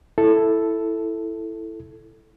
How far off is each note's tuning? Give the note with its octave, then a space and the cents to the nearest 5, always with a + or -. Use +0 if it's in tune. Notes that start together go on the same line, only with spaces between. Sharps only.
E4 +0 A4 +0